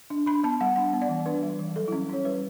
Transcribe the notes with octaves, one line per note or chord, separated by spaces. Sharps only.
D4
D4 B5
B3 A5
G3 F#5
D4 F#5
B3
D5
E3
D4 B4
G3
E3
F#3 A4
E4
C#4
C#4 C#5
G3 B4